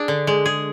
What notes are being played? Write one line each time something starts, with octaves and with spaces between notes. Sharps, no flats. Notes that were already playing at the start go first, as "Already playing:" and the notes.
Already playing: D4 G#4
D3
G#3
G#4